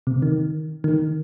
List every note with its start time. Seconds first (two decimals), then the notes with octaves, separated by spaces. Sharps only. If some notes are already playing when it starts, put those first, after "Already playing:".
0.07 C3
0.22 D#3
0.84 D#3